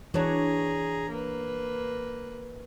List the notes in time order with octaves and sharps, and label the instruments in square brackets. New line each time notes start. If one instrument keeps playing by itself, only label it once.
[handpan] E3 C#5 [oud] D4 F#4 [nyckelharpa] G#4 A#5
[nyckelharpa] A#3 B4